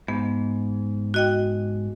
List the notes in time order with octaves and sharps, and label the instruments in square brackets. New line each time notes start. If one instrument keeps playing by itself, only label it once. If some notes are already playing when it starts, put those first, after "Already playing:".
[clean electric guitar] G#2 [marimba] B3
[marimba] F#4 D#5 G5